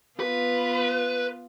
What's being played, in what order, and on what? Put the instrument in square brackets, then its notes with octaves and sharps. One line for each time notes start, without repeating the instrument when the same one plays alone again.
[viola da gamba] B3 F4 [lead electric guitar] B4